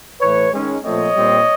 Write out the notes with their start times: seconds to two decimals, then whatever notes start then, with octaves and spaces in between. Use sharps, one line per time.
0.21 A2 E3 A3 B4 C#5
0.53 D#3 G#3 C#4
0.84 A#2 F3 A3 C4 C#5 D#5
1.16 A#2 G3 C4